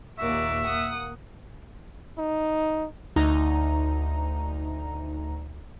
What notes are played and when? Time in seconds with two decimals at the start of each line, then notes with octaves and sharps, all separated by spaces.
0.18 D#2 A#2 A#3 F#4 D5 E5
0.65 A#3 F#5 D#6
2.18 D#4
3.16 D2 D#4 A#5